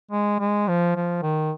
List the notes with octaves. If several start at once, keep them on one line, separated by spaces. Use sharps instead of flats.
G#3
G#3
F3
F3
D#3